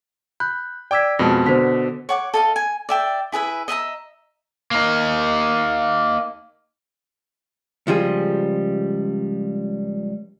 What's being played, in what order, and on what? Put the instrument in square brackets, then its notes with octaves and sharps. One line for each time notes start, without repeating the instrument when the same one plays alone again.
[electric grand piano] B5 [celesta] F#6 G6
[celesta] D5 G#6 B6 [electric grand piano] G5 D6 E6
[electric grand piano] F2 B2 G#3 [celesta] A5 A#6
[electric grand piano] B2 D3 [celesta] C5 B6
[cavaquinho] C#5 F#5 D6
A4 D#5 F5
G#5
D5 E5 G5
E4 G#4 B4 E5
D#5 E5 F#5 A#5
[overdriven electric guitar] A#3 D#4
[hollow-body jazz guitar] C#2 F3 G3 G#4